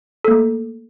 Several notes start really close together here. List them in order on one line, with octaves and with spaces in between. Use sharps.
A4 A#3 A3